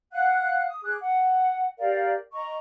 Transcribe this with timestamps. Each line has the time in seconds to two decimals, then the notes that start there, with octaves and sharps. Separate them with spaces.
0.11 F5 F#5 F#6
0.69 D#6
0.82 G#4 D6 F#6
1.00 F#5
1.78 G4 A#4 D5 F5
2.32 D#5 A#5 C#6